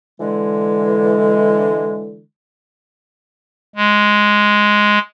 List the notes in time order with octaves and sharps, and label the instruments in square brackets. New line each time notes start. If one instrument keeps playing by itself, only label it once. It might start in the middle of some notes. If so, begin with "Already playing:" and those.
[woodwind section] D3 E3 G#3
[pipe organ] G#3